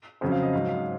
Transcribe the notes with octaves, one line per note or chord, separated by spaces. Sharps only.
F2 C#3 F#3 C5
F5
D#5
G#2 F#3 F5
F5